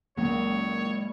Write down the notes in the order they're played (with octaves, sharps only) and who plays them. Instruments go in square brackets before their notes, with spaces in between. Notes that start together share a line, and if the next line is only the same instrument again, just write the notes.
[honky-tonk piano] C#2 [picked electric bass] F#3 G#3 [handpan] A#3 [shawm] C#5